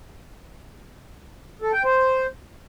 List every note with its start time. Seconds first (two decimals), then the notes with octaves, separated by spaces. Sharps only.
1.62 A4
1.73 G5
1.85 C5